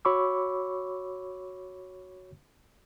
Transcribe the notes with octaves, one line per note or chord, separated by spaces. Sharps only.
F#4 C#5 B5 C#6 D6 E6